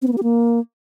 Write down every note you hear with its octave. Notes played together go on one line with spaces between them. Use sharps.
C4
B3
A#3
G4
A#3